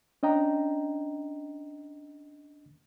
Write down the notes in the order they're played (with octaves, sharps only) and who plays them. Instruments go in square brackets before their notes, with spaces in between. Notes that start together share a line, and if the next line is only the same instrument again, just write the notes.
[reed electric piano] C#4 D4 D#5 G5 A#5